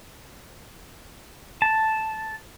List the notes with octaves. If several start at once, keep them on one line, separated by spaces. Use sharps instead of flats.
A5